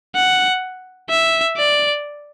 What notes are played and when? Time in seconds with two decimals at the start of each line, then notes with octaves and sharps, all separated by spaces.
0.15 F#5
1.10 E5
1.56 D5